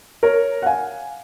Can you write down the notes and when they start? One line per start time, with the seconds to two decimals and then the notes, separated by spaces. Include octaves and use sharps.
0.23 A#4 C#5
0.62 F#5
0.66 F5 G#5